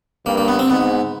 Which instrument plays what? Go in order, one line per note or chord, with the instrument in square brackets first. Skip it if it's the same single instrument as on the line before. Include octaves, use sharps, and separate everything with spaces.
[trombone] G2 [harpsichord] A#3
[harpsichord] A#3
B3
C4
[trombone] G#2 [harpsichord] B3